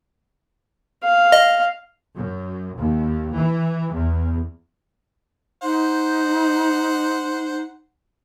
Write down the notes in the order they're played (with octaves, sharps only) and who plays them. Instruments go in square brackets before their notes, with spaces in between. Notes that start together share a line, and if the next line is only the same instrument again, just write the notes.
[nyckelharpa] F5
[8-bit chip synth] D#5
[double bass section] F#2
D#2
E3
E2
[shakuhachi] D#4 [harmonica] C5 F#5